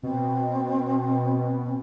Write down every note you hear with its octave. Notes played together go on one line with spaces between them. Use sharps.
B2 C4